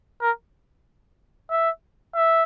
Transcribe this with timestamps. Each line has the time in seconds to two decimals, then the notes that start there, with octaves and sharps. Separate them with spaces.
0.21 A#4
1.51 E5
2.15 E5